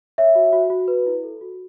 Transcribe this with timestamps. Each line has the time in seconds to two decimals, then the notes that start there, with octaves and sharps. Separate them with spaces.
0.18 C#5 E5
0.35 F#4
0.53 F#4
0.70 F#4
0.88 B4
1.06 E4
1.23 A4
1.41 F#4